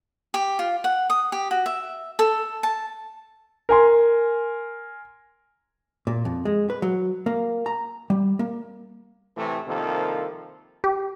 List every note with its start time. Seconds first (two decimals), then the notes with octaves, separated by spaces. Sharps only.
0.34 G4
0.59 F4
0.84 F#5
1.10 D#6
1.32 G4
1.51 F#4
1.66 E5
2.19 A4
2.63 A5
3.69 A#4 G#5 C6
6.07 A#2
6.25 F2
6.45 G#3
6.70 B4
6.82 F#3
7.26 A#3
7.66 A#5
8.10 G3
8.39 A#3
9.37 A2 C3 E3 A3
9.67 C2 C3 D#3 F3 A#3 A4
10.84 G4